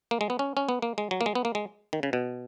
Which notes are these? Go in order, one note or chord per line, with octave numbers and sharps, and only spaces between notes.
A#3
G#3
B3
C#4
C#4
B3
A#3
G#3
F#3
A#3
G#3
B3
A#3
G#3
D#3
C#3
B2